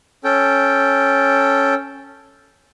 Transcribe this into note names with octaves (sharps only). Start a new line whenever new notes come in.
C#4 A4 G5